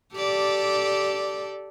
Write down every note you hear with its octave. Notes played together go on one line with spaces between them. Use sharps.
G4 A4 D5